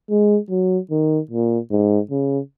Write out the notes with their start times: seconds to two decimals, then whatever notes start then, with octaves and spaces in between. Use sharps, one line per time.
0.10 G#3
0.50 F#3
0.91 D#3
1.30 A#2
1.71 G#2
2.11 C#3